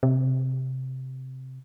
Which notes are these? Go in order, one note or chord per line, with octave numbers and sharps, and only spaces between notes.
C3